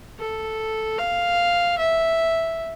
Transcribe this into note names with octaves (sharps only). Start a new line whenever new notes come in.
A4
F5
E5